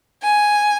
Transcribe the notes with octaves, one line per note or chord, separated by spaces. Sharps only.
G#5